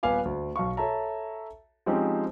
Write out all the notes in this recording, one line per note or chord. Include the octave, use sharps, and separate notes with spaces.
D#1 B3 B4 F5 G#5 D6
D2
B1 F5 C#6
A4 C#5 E5 A5 A#5
F3 G#3 C4 C#4 D#4 G4